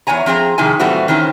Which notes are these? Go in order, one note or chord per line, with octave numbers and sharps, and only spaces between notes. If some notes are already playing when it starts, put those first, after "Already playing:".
E2 G2 C#5 G#5 A#5
F3 C4 G#4 A#5
F2 C3 D#3 E4 G#4 G#5
A#2 E3 G3 A3 C4 F#4
D#3 E3 C4 C#4